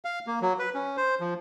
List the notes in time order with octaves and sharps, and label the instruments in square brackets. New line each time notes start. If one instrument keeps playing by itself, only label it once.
[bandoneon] F5
A#3
F#3
B4
C#4
C5
F3